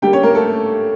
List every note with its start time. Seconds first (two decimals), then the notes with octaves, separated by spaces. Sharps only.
0.02 D3 G3 A#3 G4 G5
0.13 C#4 C#5
0.23 A#3 A#4
0.34 A3 A4